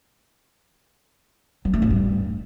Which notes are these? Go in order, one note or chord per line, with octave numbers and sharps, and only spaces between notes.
F#3
A3
G#2
G2